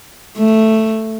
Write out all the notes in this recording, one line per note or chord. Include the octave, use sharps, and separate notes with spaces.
A3